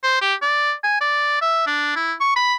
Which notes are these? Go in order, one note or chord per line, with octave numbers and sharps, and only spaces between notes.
C5
G4
D5
G#5
D5
E5
D4
E4
C#6
B5